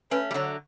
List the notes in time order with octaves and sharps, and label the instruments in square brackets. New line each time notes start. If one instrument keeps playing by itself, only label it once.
[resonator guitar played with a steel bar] A3 C#4 [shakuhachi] B4
[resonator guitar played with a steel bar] G3
[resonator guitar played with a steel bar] D3 F#3 [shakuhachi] C#5